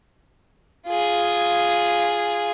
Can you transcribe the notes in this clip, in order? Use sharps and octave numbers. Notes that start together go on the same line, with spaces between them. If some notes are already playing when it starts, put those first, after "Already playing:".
F4 G#4